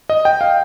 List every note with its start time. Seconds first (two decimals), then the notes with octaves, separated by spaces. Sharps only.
0.10 D#5
0.25 G5
0.41 F5